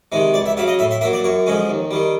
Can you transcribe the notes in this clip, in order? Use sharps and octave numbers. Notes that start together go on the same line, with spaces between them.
C3 D#3 G#3
C#2 D5
E5
C#3 F#3 E5
D#5
A2 E5
E5
F#3 A#3 E5
D5
F#2 C#5
D3 F3 G#3 C#4
D#2
D#3 G3